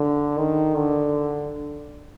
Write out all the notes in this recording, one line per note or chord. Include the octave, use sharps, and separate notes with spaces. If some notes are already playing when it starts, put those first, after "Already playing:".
Already playing: D3
D#3
D3